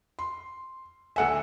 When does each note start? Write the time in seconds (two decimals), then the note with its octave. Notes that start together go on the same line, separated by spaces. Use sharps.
0.19 C6
1.16 D2 A4 E5 F#5 G#5